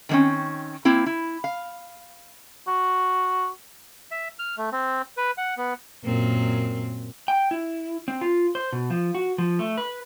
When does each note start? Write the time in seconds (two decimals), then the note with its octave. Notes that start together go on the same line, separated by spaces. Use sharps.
0.09 D#3 A3 A#3 C4 C#4
0.85 A#3 C4 E4
1.06 E4
1.44 F5
2.67 F#4
4.11 E5
4.39 F6
4.58 A3
4.72 C4
5.17 B4
5.38 F#5
5.57 B3
6.04 F#2 A#2 C4
7.28 G5
7.51 E4
8.08 C4
8.21 F4
8.55 C5
8.72 B2
8.90 F3
9.15 F#4
9.38 F3
9.59 A3
9.78 B4